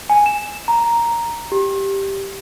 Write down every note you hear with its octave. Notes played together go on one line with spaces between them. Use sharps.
G#5
E7
A#5
G4